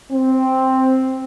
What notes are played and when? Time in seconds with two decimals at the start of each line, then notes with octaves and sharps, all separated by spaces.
0.12 C4